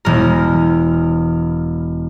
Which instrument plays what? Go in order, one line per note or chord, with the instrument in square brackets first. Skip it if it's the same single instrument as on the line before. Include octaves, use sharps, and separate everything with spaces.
[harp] E1 A#4